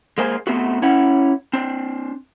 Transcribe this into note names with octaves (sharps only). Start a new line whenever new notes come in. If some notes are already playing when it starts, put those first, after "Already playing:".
G#3 A#3 C5 G#5
A3 B3 C4 F#4
C#4 E4 C#5 F#5
C4 D4